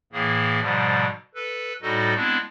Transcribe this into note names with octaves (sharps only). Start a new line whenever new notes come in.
A2 E3 A#3 G#4
G#2 B2 D3 F3 G3
A4 B4
A2 G3 D#4 F#4 A4 D#5
G#3 B3 C4 D4 E4